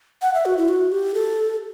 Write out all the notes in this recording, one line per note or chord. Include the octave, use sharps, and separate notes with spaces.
F#5
E5
F#4
E4
F#4
G4
A4